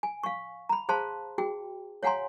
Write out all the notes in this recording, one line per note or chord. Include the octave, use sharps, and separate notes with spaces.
G#5
F5 C#6
A#5 B5
G#4 C5 F5 A5 C6
F#4 G#4 G5
C#5 F5 F#5 G#5 A#5 C6